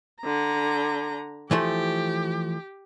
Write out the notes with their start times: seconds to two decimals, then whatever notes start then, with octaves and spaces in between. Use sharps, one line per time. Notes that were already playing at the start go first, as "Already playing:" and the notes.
0.22 D3 A#5
1.51 E3 F3 A3 G4